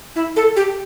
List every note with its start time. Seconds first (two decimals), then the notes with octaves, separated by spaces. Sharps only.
0.16 E4
0.36 A4
0.56 G4